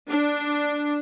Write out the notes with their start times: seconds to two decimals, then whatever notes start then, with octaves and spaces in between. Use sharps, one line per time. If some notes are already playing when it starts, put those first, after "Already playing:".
0.10 D4